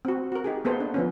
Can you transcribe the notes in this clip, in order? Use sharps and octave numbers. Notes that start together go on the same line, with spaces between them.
C4 F#4
F#4 A#4
D#4 G4 G#4
A#3 B3 G#4 A4 C5
D4
F3 B3 C#4